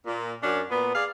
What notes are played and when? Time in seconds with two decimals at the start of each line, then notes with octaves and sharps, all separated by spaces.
0.05 A#2
0.43 F#2 C#4 D4
0.71 A#2 B3
0.95 G#4 D5 F5